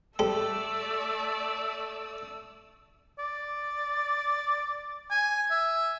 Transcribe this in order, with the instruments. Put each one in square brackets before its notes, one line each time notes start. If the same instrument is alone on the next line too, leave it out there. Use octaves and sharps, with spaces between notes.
[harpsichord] G3 A4 [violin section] A3 D5 [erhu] E6
[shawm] D5
G#5
E5